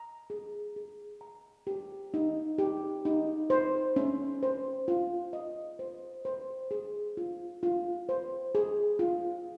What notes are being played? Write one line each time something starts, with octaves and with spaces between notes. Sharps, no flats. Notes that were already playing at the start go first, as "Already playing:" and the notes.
Already playing: A#5
G#4
G#4
A#5
G4
D#4
G4
D#4
C5
C#4
C5
F4
D#5
C5
C5
G#4
F4
F4
C5
G#4
F4